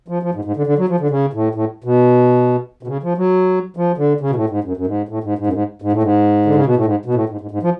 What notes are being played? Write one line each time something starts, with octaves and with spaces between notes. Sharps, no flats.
F3
F3
G#2
G#2
D3
D3
F#3
F3
D3
C#3
A2
A2
B2
B2
C#3
F3
F#3
F3
D3
C#3
B2
A2
G#2
F#2
F#2
G#2
A2
G#2
G#2
F#2
G#2
G#2
A2
G#2
D3
C#3
B2
A2
G#2
B2
A2
G#2
G#2
G#2
F3